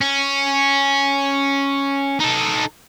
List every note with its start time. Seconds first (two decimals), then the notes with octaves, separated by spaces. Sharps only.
0.01 C#4
2.20 D#4 A4